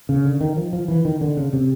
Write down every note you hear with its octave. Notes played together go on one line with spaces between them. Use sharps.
C#3
D3
D#3
F3
F3
E3
D#3
D3
C#3
C3